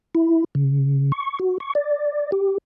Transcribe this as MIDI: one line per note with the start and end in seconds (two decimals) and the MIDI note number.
0.15 0.44 64
0.55 1.12 49
1.12 1.39 85
1.39 1.58 66
1.60 1.73 85
1.75 2.31 74
2.32 2.58 67